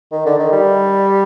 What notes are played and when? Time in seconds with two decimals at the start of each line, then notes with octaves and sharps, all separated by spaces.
0.12 D#3
0.26 D3
0.39 D#3
0.52 G3